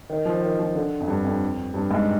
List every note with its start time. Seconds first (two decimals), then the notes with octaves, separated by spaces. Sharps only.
0.10 D#3
0.25 F3
0.42 D#3
0.59 F3
0.75 D3
1.00 F2
1.08 G2
1.25 F2
1.74 G2
1.91 G#2